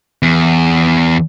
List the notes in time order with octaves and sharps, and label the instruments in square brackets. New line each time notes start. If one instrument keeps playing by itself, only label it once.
[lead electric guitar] E2